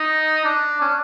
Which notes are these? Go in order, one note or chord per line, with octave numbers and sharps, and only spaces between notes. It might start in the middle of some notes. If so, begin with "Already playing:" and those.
Already playing: D#4
D4
C#4
D4